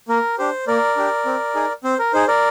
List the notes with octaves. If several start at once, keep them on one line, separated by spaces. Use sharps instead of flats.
A#3 A#4
D4 G4 C5
A#3 A#4 D5
D4 G4
C4
D#4 G#4
C4 C5
A#4
D#4 G#4 C5
A#4 D5